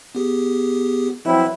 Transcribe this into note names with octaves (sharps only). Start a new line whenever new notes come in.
B3 G4 G#4
F3 F#3 C4 E4 B4